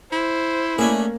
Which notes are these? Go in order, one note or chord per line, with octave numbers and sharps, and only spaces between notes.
E4 C5
A3 A#3 C#4 D4 G#4